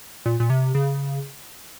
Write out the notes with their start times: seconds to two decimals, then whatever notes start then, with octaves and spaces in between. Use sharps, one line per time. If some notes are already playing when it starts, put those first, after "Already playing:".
0.26 A#2
0.40 A#2
0.50 C3
0.75 C#3